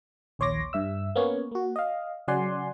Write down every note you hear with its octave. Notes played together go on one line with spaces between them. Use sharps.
A#1 D#2 C#5 C6 D6 A#6
G2 E5 E6
A#3 B3 C#4 C#5
A#3 F#4
D#5 F5
C#3 F#3 D5 F#5 G#5 C6